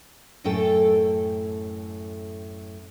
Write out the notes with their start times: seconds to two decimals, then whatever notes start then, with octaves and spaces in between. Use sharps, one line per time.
0.44 F#2 A2 A3 A4 G5